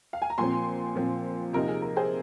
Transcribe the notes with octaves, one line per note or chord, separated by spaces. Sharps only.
F5
G#5
A#5
A#2 F3 C4 G#5 C6
A#2 F3 C4
C3 F3 A#3 D#4 A#4
G#4
A#4
G#4 C5